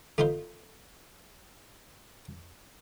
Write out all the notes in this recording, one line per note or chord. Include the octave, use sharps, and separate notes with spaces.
A3 B3 D#4 F4 C5